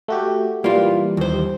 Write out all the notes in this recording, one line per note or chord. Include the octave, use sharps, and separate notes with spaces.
A3 F#4 G4
E3 G3 A#3 F4
D#2 C5